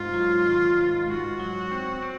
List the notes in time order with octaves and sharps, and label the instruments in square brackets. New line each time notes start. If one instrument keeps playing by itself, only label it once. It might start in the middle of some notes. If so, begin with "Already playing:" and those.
Already playing: [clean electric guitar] G#2 [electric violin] F4
[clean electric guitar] F#3
D#3
G#2
[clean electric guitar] G#2 [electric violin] F#4
[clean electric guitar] F#3
C4
C4